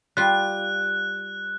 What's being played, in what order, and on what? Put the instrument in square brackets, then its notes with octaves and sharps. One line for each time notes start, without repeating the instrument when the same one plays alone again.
[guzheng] G3 F4 [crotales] F#6